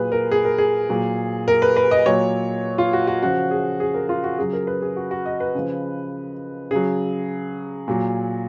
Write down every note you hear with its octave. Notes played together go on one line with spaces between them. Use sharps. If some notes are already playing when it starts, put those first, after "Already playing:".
Already playing: A#2 F#3 G#4 B4
A#4
G#4
A#4
G#4
A#2 F#3
A#4
B4
B4
D#5
A#2 F#3 C#5
F4
F#4
F#4
C#3 F3 F#4
G#4
G#4
A#4
F4
F#4
C#3 F#3 G#4
A#4
B4
G#4
F#4
F#4
D#5
B4
C#3 F3
C#3 F#3 G#4
A#2 F#3